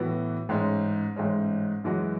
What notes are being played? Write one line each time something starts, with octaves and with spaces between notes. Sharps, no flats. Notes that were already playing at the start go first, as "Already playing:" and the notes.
Already playing: A2 E3 B3 F#4
A1 G#2 G#3 C#4
A1 G#2 G#3 C#4
F#2 E3 G#3 C#4 F#4